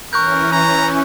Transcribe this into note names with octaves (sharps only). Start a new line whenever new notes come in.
E3 C#4 A#4 C#6 F#6 G6
A#5